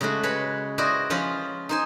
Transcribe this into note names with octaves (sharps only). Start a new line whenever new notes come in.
C#3 G#3 A3 F#4
G#3 B4 C#5 B5
E4 F#4 C5 D5 D#5
F3 C#4 F4 F5 B5
D#4 C5 G#5